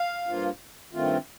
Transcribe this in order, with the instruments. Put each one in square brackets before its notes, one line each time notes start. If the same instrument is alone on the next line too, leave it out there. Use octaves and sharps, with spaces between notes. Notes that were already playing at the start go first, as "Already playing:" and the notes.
Already playing: [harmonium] F5
G2 F3 A#3 F4
G2 D#3 A3 C4 F4